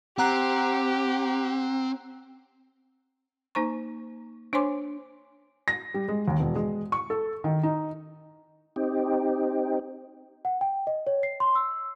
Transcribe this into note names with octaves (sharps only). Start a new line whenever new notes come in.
C4 G4 F#5 A#5 F#6
A#3 D#4 C5 A#5 C#6
D4 C5 C#5 G#5 C6 D6
A#6
G3
G#3
D#2
E1
G#3
C#6
A4
D#3
D#4
C4 D#4 G4
F#5
G5
D#5
C#5
C7
C6
E6